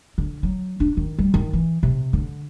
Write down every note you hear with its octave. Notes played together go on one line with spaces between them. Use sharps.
D3
F#3
D4
D#3
G3
D#3
E3
C3
D3